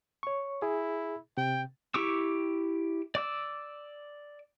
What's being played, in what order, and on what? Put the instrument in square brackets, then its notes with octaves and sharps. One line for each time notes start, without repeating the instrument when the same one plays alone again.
[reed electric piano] C#5 C#6
[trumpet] E4 [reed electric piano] G#4
[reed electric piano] C3 [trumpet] G5
[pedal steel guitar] E4 G4 C#6 D6 E6
D5 D6 E6